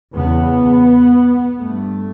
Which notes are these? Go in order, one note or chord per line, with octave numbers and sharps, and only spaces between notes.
E2 C#3 B3
G2 A3